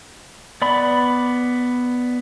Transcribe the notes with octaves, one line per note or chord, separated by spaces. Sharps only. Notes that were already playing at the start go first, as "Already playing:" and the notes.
B3 D5 B5